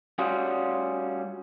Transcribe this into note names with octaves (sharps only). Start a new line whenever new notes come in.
G3 C#4 F4 F#4 G#4